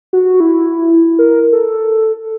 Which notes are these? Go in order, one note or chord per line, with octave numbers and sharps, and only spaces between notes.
F#4
E4
A#4
A4